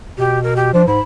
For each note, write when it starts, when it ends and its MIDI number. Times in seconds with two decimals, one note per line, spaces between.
0.18 0.69 47
0.18 0.42 67
0.43 0.54 70
0.56 0.74 67
0.74 0.83 53
0.74 0.82 62
0.87 1.00 44
0.87 1.01 83